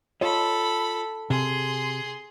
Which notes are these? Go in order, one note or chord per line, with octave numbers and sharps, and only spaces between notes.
F4 A4 C#5 D#5 B5
C3 G#4 C6